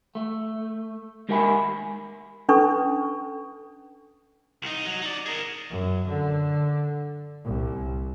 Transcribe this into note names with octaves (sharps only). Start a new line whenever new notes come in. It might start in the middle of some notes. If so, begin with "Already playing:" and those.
A3
G#3 G4 A#4 E5 G#5 B5
C#4 D4 A4 B4 C#6
C2 D#4
F#3
D#4 D5
G#4 A#4
F#2
D3
C2